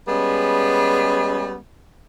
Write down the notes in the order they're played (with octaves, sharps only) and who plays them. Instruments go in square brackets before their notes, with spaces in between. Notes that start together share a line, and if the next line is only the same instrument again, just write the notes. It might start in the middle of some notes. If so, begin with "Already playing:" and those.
[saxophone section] G3 G#3 B3 C#4 G#4